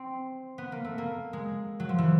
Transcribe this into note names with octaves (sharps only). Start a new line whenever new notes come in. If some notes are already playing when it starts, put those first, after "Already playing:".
Already playing: C4
B3
A#3
A3
A#3
G#3
F#3
F3
E3